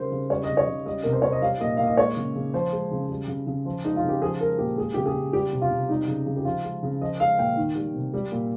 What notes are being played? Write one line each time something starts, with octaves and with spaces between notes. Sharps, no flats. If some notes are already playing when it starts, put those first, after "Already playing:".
Already playing: C#3 G3 A#4 C5
C#3
G3 C#5
D#5
C#3
C#5
C#3
G3 D#5
C3 A#4
C5
C3 C#5
D#5
G3 F5
A#2 D#5
A#2 F5
D#5
G#3 C#5
C#3
C#3
F3 C5
G#3
C#3
G3
C#3
C#3
F3
G#3 D#4
F4
C#3
G4
F3 G#4
G#3 A#4
A#2 G4
G#3 G#4
C#3 G4
G#4
C#3
G3 G4
C3
F4
C3
G3 D#4
C#3
C#3
G4
F3 F4
G#3
C#3
F3 D#5
G#3 F5
A#2 G5
D#3
G3
C3
G3
A#2